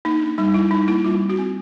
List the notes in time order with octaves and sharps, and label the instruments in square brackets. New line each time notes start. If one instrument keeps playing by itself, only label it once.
[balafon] A#3 D#4
D4
G3 D#4
G3 E4
G3 D#4
A#3 E4
G3 F4
C4
F#4
C4